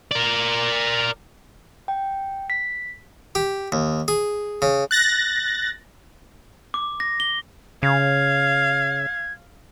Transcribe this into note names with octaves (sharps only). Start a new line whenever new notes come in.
A#4 D5
G5
B6
G4
D#2
G#4
C#3
F#6 A6 A#6
D6
A#6
G7
C#3 F5 G#6